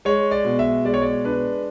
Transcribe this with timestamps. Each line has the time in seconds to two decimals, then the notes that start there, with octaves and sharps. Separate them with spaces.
0.05 G#3 C#5
0.31 D5
0.45 B2
0.59 E5
0.85 G#3 D5
0.94 C#5
1.02 D5
1.24 D4 B4